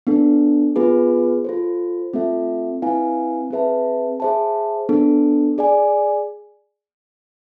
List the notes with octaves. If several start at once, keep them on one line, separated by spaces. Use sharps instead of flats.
B3 D4 A4
B3 F4 G#4 B4
F4 A4 C5
A3 C4 F4 A4 E5
C4 E4 B4 F5 G#5
C4 G#4 B4 E5 A5
G#4 C5 E5 A5
B3 D4 A4
G#4 D5 G#5